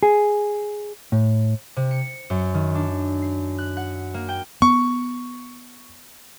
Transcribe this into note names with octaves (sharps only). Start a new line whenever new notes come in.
G#4
A2
C3
C#7
F#2
D#3
D4
C7
F#6
F#5
A#3
G5
B3 C#6